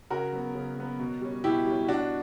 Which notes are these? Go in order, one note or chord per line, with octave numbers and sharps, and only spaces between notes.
C#3 F#4 A#4
F#3 B3
C#3
F#3 B3
B2
G3 C#4
B2 E4 G4
G3 C#4
B2 D4 F#4